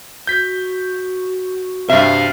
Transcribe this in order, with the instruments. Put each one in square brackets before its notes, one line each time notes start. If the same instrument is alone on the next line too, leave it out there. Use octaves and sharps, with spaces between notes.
[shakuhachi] F#4 [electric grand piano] G6 B6
[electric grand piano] G2 C3 [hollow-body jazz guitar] E5 [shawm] F5